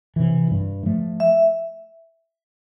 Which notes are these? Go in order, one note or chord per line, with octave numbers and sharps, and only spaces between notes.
C3 E3
G2
F3 A3
E5